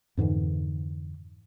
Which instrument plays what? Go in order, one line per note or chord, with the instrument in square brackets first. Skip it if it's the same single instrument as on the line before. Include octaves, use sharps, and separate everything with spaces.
[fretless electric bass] F2 G#2 D3 E3